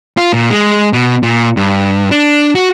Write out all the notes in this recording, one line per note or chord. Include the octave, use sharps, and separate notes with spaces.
F4
A#2
G#3
B2
A#2
G2
D4
F#4